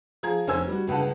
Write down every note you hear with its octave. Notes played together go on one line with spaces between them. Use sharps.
F3 G#4 A#5 G#6
F1 C#4 C5 G#5 E6 G#6
G3 F#4
G1 C#2 B4 F#5 A5